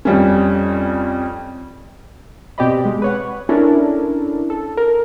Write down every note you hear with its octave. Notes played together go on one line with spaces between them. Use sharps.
F2 G3 C#4
B2 C4 G4 D5 D#5 B5
G#3
B4 C#5 F#5
C#4 D4 E4 A4 A#4
A4
A#4